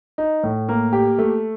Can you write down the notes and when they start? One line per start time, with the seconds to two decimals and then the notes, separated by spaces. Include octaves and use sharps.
0.18 D#4
0.43 A2
0.69 A#3
0.93 G4
1.18 A3